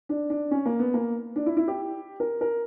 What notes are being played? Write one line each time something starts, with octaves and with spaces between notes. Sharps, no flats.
D4
D4
C#4
A#3
B3
A#3
D4
E4
E4
G4
A#4
A#4